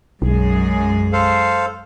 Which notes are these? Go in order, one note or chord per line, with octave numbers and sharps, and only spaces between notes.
B1 F#2 G#3 G#4
A4 C5 F5